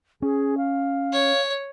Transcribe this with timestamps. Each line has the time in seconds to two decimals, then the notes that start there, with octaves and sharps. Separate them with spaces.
0.22 C#4 G#4
0.58 F5
1.13 C#5